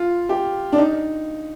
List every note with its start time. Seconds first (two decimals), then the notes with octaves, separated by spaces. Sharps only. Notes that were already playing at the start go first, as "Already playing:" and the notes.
Already playing: F4
0.29 G4
0.72 D4
0.78 D#4